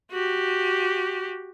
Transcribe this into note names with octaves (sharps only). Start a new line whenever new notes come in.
F#4 G4